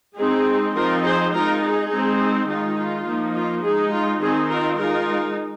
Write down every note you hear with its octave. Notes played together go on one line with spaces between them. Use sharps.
G#3 C4 D#4 G#4
F3 C4 D#4 F4 A#4
G#4 C5
G#3 D#4 F4 A#4
G#4
G#3 C4 D#4
D#3 G#3 D#4 F4
F4
F3 A#3 D#4
F4
G#3 D#4 G#4
F4
D#3 C4 D#4 G#4
F4 A#4
G#3 D#4 F4 A#4